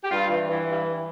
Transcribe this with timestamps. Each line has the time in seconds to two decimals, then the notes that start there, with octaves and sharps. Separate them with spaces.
0.04 G4
0.11 G2 F4
0.30 E3
0.49 E3
0.68 G2